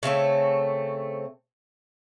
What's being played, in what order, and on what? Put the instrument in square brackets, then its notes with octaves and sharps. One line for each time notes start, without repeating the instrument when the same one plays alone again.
[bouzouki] C#3 A3 C4 C#5